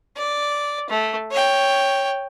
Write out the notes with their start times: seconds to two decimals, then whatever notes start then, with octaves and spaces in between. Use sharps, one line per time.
0.16 D5
0.90 A3
1.31 C#5 G5